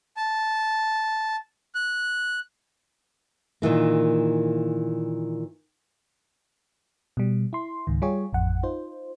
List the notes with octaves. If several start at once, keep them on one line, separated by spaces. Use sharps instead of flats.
A5
F#6
A#2 D#3 E3 A#3
B2 G3
E4 C6
C#2 G#2 D#3
G3 F4 G4 G#4 C#5
A1 F2 F#5
D#4 F4 C5